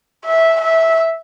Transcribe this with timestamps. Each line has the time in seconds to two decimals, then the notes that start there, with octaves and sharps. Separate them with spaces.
0.25 E5
0.61 E5